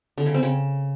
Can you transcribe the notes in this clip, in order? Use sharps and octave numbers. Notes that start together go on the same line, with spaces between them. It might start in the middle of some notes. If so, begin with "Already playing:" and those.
D3
C#3
C4
C#3